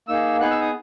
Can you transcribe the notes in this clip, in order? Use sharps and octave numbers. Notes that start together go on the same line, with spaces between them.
A#3 D#4 G#4 E6
B3 D#4 G#4 F#6
E6
D#6